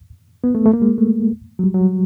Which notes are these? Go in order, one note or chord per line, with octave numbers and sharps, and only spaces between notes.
B3
A3
A3
A#3
G#3
A3
F#3
G3
F#3